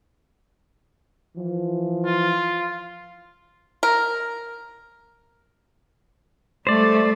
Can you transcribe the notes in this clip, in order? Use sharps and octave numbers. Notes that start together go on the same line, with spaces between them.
E3 F3
F4
A#4
G3 A3 C5 D5